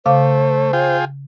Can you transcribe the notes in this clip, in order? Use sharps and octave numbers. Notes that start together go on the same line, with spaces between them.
C#3 A3 C5 F5 D6
F4 G#4 G5